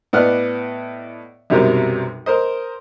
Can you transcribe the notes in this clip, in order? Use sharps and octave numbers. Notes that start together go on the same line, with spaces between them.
A2 B3 D5 D#5 F#5 F6
B1 F#2 C3 F#3 G3 A#4
A#4 C5 D#5